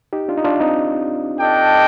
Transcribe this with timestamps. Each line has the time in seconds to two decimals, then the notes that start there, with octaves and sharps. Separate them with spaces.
0.13 D#4 G4
0.29 D4 F4
0.38 D#4
0.44 D4 F4
0.60 C4 D#4
1.40 D4 A4 D#5 G5